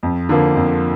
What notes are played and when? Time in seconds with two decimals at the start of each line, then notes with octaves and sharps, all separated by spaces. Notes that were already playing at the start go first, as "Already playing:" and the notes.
0.03 F2
0.29 D3 F3 A#3
0.56 F2